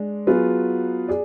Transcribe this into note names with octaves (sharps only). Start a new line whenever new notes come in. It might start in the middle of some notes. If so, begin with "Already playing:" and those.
Already playing: G#3 D4
F#3 B3 F4 G#4 B4
G#4 D5